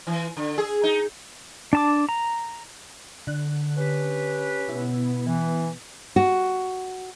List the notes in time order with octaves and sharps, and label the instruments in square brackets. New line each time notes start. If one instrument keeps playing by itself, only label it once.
[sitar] E3
D3
G#4
D#4
[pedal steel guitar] D4 A5 D6
A#5
[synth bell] D3 F#6
[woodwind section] C#4 G4 B4
[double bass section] B2 B3 [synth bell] E4
[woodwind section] E3
[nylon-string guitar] F#4